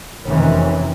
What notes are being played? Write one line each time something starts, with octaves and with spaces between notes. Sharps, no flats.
F1 D#3 E3 C4 C#4